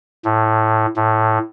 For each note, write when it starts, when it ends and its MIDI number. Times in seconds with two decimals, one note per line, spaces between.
0.25 0.86 45
0.96 1.38 45